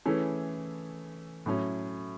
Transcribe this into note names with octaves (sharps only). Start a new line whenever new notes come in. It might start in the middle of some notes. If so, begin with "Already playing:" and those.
E3 A3 C#4 E4 G#4
A2 F#3 C#4